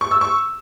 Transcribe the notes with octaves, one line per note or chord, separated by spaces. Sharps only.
C#6
E6
C#6